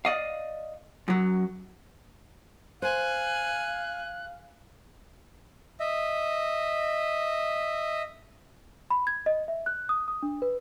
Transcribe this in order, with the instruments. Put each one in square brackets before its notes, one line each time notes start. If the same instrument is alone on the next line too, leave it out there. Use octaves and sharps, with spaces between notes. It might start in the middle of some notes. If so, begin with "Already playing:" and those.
[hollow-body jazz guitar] D5 D#5 F5
F#2 F#3
[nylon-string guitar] C5 [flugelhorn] F5 [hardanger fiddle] G#5 [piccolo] F#6
[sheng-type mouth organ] D#5 E5
[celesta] B5
G#6
D#5
E5
F#6
D#6
D#6
D4
B4